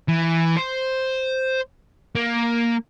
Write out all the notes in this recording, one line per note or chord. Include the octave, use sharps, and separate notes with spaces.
E3
C5
A#3